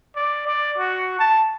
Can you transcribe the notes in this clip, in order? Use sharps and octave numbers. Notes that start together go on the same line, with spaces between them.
D5
D5
F#4
A5